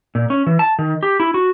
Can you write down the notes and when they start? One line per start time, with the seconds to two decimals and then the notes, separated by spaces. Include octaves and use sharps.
0.15 A#2
0.30 C#4
0.47 E3
0.59 A5
0.79 D#3
1.03 G4
1.20 E4
1.34 F#4